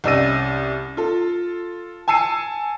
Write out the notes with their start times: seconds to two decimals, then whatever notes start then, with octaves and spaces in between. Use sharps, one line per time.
0.04 C2 C#4 D5 E6 A#6 D#7
0.97 F4 A4
2.08 G#5 A5 E6 C7 C#7 D#7